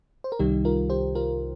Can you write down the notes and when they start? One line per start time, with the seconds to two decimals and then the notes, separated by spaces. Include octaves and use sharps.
0.24 C5
0.32 A#4
0.39 C2 C3 D#3 G3 D#4 G4
0.65 F4 A#4
0.90 G4 C5
1.15 F4 A#4